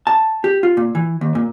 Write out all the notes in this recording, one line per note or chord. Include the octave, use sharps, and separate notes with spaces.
A5
G4
F4
A#2
E3
D#2
A#2